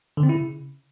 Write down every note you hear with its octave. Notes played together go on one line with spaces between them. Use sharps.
D3
C4
E4
C#3